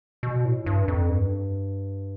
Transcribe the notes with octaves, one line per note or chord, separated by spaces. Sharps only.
B2
A2
G2
F2
G2